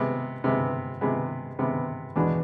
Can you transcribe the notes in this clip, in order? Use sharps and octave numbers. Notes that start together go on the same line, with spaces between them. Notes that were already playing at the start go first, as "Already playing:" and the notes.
Already playing: C3 G#3 B3
C3 G#3 B3
C3 G#3 B3
C3 G#3 B3
E2 B2 G#3 D4